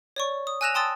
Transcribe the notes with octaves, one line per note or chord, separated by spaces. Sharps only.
C#5 D5 C#6
D#6
G#5 E6 F#6 A#6 E7 F7
G5 A5 C6 D#6 E6 A6